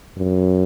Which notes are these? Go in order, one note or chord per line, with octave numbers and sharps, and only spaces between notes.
F#2